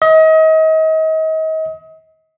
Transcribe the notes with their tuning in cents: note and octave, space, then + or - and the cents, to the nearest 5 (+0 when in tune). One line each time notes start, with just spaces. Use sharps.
D#5 +35